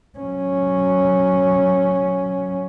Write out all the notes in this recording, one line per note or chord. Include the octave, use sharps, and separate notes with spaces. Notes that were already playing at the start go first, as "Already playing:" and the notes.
F#3 C#4